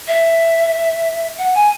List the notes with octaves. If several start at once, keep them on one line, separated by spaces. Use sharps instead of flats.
E5
F#5
G#5